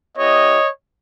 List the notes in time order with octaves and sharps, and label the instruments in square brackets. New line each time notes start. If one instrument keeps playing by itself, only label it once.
[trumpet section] B3 E4 G4 C#5 D#5